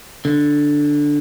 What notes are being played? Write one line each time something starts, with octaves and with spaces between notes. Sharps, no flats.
D3